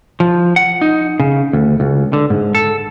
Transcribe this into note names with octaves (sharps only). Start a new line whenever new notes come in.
F3
F#5
D#4
C#3
D2
C#2
D3
G#2
A4